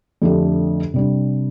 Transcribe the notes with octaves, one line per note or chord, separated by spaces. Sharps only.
F2 D3 A3 D4 G4
C3 G3 D4